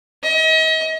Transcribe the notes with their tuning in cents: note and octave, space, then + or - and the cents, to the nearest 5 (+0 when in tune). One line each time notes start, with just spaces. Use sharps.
D#5 +40